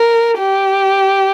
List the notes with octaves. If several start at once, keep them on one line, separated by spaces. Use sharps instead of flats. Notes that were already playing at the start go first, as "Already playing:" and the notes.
Already playing: A#4
G4